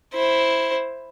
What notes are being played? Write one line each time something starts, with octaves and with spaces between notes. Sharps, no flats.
E4 C5